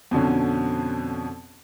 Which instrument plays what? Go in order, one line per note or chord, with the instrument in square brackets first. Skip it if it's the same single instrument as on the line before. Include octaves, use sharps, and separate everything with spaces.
[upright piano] F2 B2 D3 C#4